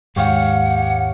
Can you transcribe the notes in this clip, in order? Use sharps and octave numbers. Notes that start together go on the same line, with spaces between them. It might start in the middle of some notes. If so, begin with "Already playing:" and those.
D#2 G#2 G#3 G4 C#5 F5 F#5